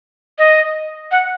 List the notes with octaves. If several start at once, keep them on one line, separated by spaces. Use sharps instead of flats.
D#5
F#5